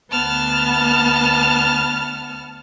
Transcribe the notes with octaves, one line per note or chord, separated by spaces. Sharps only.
D2 B3 A5 F6